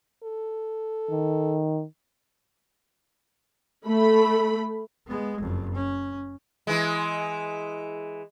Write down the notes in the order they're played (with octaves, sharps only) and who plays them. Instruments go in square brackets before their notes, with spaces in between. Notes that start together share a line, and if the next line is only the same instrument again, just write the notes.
[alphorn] A4
[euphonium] D#3
[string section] A3 B5
[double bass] G#3 B3
F#1 F2
C#4
[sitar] E3 G#3